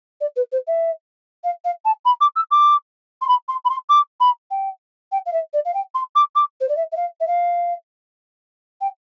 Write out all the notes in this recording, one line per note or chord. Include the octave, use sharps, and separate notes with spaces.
D5
B4
C5
E5
F5
F5
A5
B5
D6
E6
D6
C6
B5
C6
B5
C6
D6
B5
G5
G5
F5
E5
D5
F5
G5
C6
D6
D6
C5
D5
E5
E5
F5
E5
F5
G5